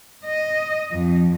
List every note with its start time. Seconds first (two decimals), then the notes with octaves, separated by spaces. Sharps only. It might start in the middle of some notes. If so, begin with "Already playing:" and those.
0.25 D#5
0.92 F2